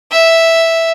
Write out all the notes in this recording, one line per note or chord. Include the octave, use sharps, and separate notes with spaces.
E5